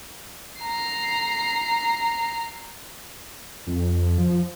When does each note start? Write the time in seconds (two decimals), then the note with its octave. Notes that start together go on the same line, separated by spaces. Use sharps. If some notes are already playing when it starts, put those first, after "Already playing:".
0.61 A#5 C7
3.67 F2
4.18 F3